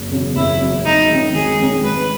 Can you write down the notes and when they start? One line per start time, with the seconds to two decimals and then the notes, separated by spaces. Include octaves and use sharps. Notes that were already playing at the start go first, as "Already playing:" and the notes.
Already playing: F#1
0.11 E2 C#3 F#3
0.35 F#1 E4
0.60 E2 C#3 F#3
0.85 G#1 D#4
1.09 G#2 D#3 G#3 C#4
1.34 G#1 G#4
1.59 G#2 D#3 G#3 C#4
1.84 G#1 B4